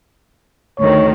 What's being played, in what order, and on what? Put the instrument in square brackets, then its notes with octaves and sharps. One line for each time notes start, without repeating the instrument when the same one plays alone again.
[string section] D2 D#3 [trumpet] C#5